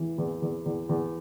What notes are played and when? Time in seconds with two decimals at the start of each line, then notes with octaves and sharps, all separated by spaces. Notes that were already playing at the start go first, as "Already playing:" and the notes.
Already playing: E2 E3
0.18 E2
0.42 E2
0.66 E2
0.89 E2